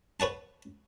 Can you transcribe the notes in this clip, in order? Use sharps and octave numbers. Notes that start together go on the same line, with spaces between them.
B4 C#5 F#5 A5